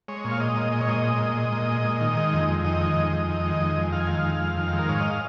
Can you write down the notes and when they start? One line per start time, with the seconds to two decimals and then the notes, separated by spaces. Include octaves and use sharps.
0.08 G#3 C#5
0.24 A#2
0.31 F5
0.40 G#3 D#5
0.57 A#2
0.72 G#3 D#5
0.81 C#5
0.88 A#2 D#5
1.04 G#3
1.21 A#2
1.37 G#3
1.53 A#2
1.69 G#3
1.84 A#2
2.01 D#3
2.17 G#3
2.33 F2
2.49 F2
2.64 D#3 D#5
2.81 G#3
2.96 F2
3.13 F2
3.29 D#3
3.45 G#3
3.61 F2
3.77 F2
3.92 D#3 F5
4.00 G#5
4.07 G#3 F5
4.25 F2
4.41 F2
4.57 D#3
4.73 G#3
4.79 A#4
4.89 G#2 C#5
5.00 D#5
5.10 F5